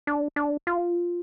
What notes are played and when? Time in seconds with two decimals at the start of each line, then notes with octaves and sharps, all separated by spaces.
0.07 D4
0.36 D4
0.67 F4